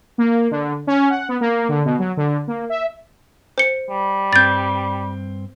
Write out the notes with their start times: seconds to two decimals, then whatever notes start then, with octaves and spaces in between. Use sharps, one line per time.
0.18 A#3
0.51 D3
0.87 C#4
1.10 F#5
1.29 B3
1.41 A#3
1.69 D3
1.85 B2
1.99 F#3
2.17 D3
2.47 A#3
2.70 E5
3.58 C5 C#7
3.90 G3
4.33 G2 C4 G6 A6